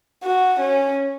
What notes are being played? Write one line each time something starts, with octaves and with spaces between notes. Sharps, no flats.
F#4
C#4